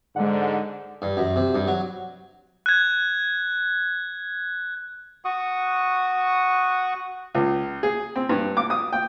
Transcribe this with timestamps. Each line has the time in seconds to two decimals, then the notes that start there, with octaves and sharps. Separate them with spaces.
0.16 G#2 D3 G#3 F#5
1.02 G2
1.17 F#2
1.36 C3
1.55 G2
1.67 F#3
2.66 F#6 G#6
5.25 F#4 F#5 C#6 D#6
7.35 C#2
7.83 G#4
8.16 C4
8.29 G2
8.57 D6
8.70 D#6
8.92 G5